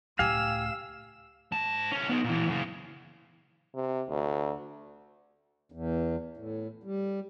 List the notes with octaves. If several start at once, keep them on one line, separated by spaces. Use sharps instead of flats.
C#2 A2 G4 F5 G#5 E6
G#2 A5
C2 C#4
B3 D#4
A#2 E3
F#2 C#3
C3
D2
E2
A2
G3